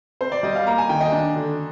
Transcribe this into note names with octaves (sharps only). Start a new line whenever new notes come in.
C4 C5
D5
G3 D#5
F5
A#3 A#5
G#5
D#3 G5
D#5
D4
D3